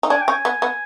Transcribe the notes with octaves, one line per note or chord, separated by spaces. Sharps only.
D#4
D4 G#5
G5
C#4
G#5
B3
B3